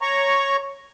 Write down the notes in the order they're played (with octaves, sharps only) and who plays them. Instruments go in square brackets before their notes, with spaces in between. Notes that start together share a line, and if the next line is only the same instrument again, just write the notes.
[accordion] C#5 A#5 C#6